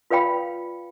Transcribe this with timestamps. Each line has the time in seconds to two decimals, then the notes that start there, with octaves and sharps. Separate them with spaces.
0.10 F4 B4 D5 F5 G5 B5